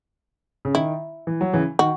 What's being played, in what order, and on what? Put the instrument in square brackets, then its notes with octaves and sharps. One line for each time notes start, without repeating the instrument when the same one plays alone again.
[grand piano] C#3
[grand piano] D#3 [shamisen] E4
[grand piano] E3
F#3
C#3 E3
[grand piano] D#3 [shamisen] F#4